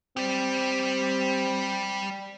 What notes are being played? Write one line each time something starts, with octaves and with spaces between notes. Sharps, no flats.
G3 C4 G4